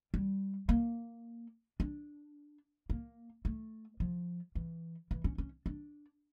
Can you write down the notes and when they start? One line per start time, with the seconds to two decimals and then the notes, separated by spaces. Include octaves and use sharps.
0.14 G3
0.69 A#3
1.80 D4
2.90 A#3
3.45 A3
4.00 F3
4.55 E3
5.11 E3
5.24 C#4
5.38 C#4
5.66 D4